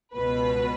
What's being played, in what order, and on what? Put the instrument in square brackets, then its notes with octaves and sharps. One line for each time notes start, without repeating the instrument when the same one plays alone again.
[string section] C#2 B2 B4